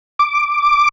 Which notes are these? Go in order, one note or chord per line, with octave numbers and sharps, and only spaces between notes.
D6